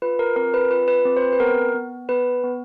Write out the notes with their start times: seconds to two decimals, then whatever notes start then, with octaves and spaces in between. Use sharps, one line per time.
0.02 F4 B4
0.19 A#4
0.36 C4 A#4
0.54 B4
0.71 F4 B4
0.88 B4
1.05 C4
1.17 C5
1.22 B4
1.33 B4
1.40 B3 A#4
1.75 B3
2.09 B3 B4
2.43 B3